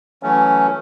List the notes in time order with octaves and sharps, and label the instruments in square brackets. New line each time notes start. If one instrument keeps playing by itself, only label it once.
[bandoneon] E3 F#3 A3 C#4